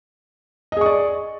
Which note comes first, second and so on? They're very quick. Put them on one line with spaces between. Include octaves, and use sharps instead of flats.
D#5 G#4 C#6 D5